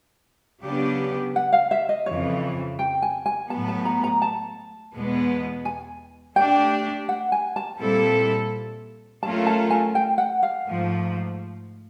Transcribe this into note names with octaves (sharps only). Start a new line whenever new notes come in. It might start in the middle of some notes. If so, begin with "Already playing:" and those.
C#3 F#3 B3 D4 G4
F#5
F5
E5
D#5
F2 C#3 E3 C#5
G5
G#5
G#5
A2 F#3 B3 A5
A5
A#5
A#5
A5
E2 B2 G#3 B3
G#5
A3 D4 G4 G5
F#5
G#5
A5
A#2 G3 C4 E4 A4
F#3 A3 C#4 F4 A#4 A5
A5
G#5
G5
F#5
F5
G#2 F3 A3